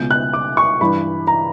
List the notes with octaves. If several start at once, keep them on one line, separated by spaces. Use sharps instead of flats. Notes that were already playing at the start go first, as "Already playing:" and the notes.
Already playing: C#2 B2 G6
F#6
D6
C#6
G2 E3 B5
A#5